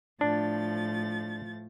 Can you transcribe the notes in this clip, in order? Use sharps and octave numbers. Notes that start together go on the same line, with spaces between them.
A2 F3 D4 A6